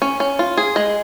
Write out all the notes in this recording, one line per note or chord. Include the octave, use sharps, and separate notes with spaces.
C#4
C#4
F4
G#4
G#3